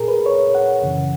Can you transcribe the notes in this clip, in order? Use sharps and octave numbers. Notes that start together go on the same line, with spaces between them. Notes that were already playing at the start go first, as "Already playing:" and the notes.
Already playing: A#2 G#4 A#4
B4
C#5
F#5
F#2 C#3 E3